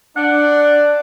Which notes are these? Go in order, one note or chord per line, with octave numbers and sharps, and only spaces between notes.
D4 F#5